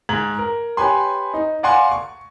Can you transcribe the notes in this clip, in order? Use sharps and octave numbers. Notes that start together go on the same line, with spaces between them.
G#2 G#6 F#7
A#4
G4 B4 C#5 G#5 B5 C6
D#4
D5 F5 F#5 G#5 A#5 C6
C#6